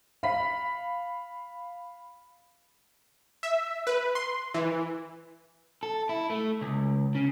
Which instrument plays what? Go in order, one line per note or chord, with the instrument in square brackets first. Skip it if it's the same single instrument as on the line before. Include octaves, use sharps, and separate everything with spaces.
[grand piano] F5 B5 B6
[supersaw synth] E5
B4
C6
E3
[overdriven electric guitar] A4
E4
A3
C#2
C#3